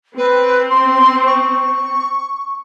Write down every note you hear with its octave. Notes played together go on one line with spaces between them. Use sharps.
C4 B4
C6
C#6